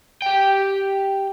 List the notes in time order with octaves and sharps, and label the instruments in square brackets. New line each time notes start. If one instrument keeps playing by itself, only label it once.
[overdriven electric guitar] G4 G5